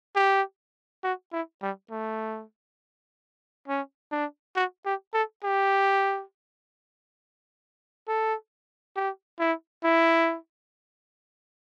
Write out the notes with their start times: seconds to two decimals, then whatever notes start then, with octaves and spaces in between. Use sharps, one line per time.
0.16 G4
1.04 F#4
1.33 E4
1.62 G3
1.91 A3
3.68 C#4
4.12 D4
4.56 F#4
4.85 G4
5.14 A4
5.44 G4
8.08 A4
8.96 G4
9.39 E4
9.84 E4